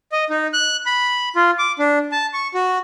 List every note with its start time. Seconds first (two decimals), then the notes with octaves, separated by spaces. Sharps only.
0.12 D#5
0.30 D#4
0.53 F#6
0.86 B5
1.36 F4
1.59 D6
1.79 D4
2.12 A5
2.33 C#6
2.54 F#4